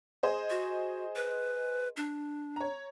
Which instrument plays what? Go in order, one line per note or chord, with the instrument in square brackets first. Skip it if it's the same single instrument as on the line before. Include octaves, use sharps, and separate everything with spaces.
[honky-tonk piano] G#4 C5 D#5
[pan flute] F#4
B4
D4
[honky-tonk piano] C#5 A#5